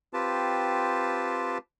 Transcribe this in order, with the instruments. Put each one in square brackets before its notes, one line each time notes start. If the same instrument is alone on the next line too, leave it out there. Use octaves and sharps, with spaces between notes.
[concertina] C4 F4 G4 B4 A5